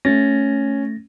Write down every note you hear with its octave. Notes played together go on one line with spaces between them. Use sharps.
A3 C#4 A6 A#6